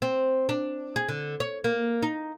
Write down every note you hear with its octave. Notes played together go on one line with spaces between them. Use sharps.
C4
D4
G#4
D3
C#5
A#3
D#4